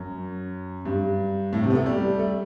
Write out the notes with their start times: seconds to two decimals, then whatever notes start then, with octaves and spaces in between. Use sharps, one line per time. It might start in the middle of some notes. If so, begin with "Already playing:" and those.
Already playing: F#2
0.85 G2
1.53 A2
1.63 C3
1.70 B3
1.75 A3
1.86 G3
2.19 A3